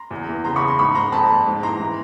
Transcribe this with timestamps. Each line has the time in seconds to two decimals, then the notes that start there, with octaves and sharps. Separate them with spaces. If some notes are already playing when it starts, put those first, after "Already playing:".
Already playing: A#5 C6
0.11 E2
0.28 E3
0.44 C#3 A#5 C6
0.56 B5 C#6
0.62 E2
0.67 A#5 C6
0.79 G#2 B5 C#6
0.95 G#2 A#5 C6
1.12 F2 A5 B5
1.30 F2
1.46 G#2
1.63 E3 A#5 C6
1.80 E3